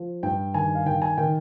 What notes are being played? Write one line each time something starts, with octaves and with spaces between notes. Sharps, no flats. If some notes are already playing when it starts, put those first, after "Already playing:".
Already playing: F3
G2 G5
D#3 G#5
F5
D#3 G5
G#5
D#3 G5